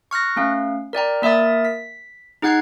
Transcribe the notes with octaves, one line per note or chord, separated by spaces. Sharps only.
C#6 F6 F#6 A#6
A3 C#4 F5
A#4 D5 G5 A#5
A#3 A#4 E5 D#6 A6
B6
D#4 G#4 F#5 F#6 G#6 C7